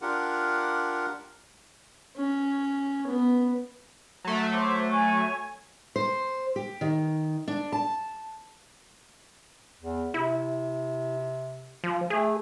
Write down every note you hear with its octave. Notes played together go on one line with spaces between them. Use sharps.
D4 F4 G4 A#4 F#5
C#4
B3
F#3 A3
C5 C6 D6
C#5 G#5 C#6
C5
G4
D#3
D4
A5
E2
C3 E4
F3
A3 G#4